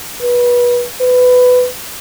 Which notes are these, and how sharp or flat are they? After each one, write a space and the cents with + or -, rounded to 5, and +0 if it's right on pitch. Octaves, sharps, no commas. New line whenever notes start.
B4 -25
B4 +15